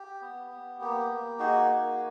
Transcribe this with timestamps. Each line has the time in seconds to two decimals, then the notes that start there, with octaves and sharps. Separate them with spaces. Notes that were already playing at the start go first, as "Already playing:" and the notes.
Already playing: G4
0.22 B3
0.51 B3
0.81 A#3 G4
1.10 A#3
1.39 D#4 F#4 G#4
1.69 A#3